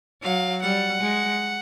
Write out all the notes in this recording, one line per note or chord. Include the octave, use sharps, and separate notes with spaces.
F#3 F5
G3 F#5
G#3